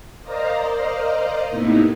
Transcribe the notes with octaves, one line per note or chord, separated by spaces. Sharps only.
A#4 C5 D5 D#5 F5 A#5
A2 C3 A#3 B3 D#4 E4